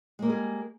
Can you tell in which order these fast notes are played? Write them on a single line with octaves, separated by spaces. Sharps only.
G#3 A#3 G3 G#4